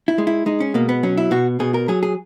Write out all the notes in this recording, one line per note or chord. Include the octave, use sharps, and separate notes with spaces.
E4
G#3
E4
G#3 D#4
C#4
B2 A#3
B3
F#3 C#4
E4
B2 F#4
B2 G#4
A#4
F#3 G#4
G#4